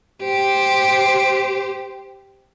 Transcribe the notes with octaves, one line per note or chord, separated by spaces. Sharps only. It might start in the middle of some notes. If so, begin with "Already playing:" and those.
G4 C5